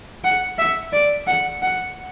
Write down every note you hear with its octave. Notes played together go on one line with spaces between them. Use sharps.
F#5
E5
D5
F#5
F#5